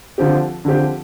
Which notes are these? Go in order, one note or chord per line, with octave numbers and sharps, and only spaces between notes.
D3 F3 C4 G4
D3 F3 C4 G4